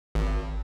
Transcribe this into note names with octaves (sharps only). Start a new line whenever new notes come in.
G#1